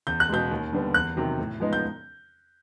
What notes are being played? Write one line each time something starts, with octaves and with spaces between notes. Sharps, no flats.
E2 G6
F#6
B2 G#3 G6
D#2
D3 G3 B3
E2 F#6
C3 D#3 F#3
A2
F3 G#3 B3 D#4
G6